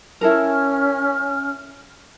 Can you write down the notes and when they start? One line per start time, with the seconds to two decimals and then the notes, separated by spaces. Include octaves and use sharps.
0.21 C#4 E4 A4 A#4 F6